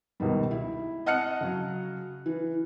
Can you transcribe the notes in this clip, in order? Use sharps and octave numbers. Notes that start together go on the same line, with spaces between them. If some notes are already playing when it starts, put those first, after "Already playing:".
C#2 B2 D#3 G3
E4
D#5 F#5 A5 F6 F#6 C#7
C#3 F#3
E3